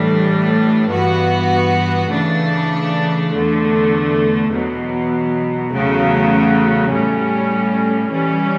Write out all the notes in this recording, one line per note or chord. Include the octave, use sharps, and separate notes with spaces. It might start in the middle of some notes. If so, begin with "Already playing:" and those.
Already playing: A2 E3 G3 D4
G2 E3 B3 F#4
C#3 E3 A3 D4
E2 D3 A3
E2 B2 F#3
E2 C#3 F#3 A3
A2 G3 C#4
E3 G3 C#4